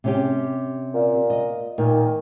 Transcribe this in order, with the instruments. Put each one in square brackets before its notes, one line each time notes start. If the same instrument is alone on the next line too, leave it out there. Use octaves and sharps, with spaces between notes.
[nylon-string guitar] C3 C#4 G4
[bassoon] A#2
[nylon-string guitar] D#5
[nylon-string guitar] A#2 [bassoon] D#3